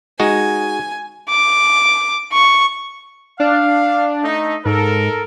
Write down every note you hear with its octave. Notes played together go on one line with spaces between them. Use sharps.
G#3 D#4 F#4 G#5
D6
C#6
D4 F5
A3 D#4
G#2 A4 A#4